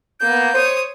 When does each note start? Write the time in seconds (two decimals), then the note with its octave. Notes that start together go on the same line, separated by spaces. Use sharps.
0.20 A#3 B3 G6
0.54 C5 C#5 D#6